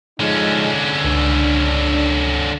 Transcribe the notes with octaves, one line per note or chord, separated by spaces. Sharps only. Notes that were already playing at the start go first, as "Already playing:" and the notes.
D3 F3 G#3 C#4 D#4
C#2 D4